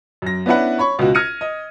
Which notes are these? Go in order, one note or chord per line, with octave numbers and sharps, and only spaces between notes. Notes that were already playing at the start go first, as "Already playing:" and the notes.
F#2 A#6
B3 C#4 D4 E4 B4 F#5
C#5 B5 C#6
C#2 B2 F#4
F6 G#6 A#6 C#7 D#7
D#5